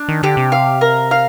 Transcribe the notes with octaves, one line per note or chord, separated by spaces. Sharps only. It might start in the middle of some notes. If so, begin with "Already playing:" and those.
Already playing: D4
D#3
D3 G4
C3
F5
A#4
F5